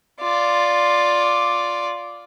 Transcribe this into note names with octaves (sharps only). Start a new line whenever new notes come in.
F4 D5